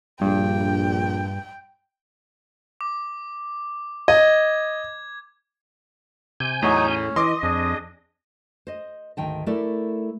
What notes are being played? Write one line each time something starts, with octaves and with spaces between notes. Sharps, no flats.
A#1 G2 G5
D6
D#5 G#6
C3 G#5 G6
E2 A2 F#3 D#4 C#5
C#4
E3 D#5 C6 D6
F2 D4 G#4
C5 D#5
D2 G#2 D#3 G5 A5
A3 E4 A4 A#4 D5